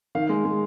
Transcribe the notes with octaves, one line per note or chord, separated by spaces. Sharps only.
D#3 F5
G#3
G#3